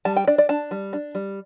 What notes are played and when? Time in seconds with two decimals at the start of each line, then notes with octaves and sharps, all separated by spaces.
0.05 G3 A5
0.16 G5
0.27 D4 D5
0.38 D5
0.49 D4 A5
0.71 G3
0.93 D4
1.15 G3